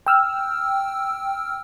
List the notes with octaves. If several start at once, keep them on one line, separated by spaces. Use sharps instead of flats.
G5 E6 F6